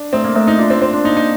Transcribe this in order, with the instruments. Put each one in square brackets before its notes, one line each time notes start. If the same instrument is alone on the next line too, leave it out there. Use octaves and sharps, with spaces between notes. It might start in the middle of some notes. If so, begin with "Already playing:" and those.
Already playing: [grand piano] D4
[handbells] A3 [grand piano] C4
[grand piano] A#3
[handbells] A3 [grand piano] C4
[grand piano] D#4
[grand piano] D4 [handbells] F4
[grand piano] C4
[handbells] A#3 [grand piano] C4
[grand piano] D4
[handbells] A#3 [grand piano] D#4
[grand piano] D#4